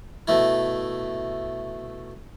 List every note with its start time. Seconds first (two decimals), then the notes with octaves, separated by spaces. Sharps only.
0.28 B2 A3 E4